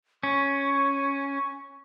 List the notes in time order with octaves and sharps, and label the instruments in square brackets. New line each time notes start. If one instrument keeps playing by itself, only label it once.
[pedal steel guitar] C#4 [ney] C#6